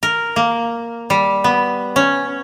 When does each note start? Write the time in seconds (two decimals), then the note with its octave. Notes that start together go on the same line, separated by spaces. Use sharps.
0.03 A#4
0.36 A#3
1.10 G3
1.44 B3
1.96 C#4